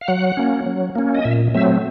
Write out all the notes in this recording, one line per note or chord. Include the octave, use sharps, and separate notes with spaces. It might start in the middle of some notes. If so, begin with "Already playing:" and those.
F5
F#3 F#5
A#3 C#4
F#3
A#3 C#4
D#5
A#2 E5
F#3 A3 C4 E5